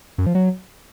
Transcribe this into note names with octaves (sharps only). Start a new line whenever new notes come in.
F#2
F3
F#3